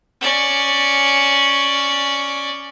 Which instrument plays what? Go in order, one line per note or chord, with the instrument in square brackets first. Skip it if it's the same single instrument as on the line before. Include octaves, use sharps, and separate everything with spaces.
[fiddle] C#4 D5